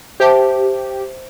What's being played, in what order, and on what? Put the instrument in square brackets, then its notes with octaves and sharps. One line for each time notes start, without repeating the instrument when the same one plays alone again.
[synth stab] G4 [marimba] C5 E5 A5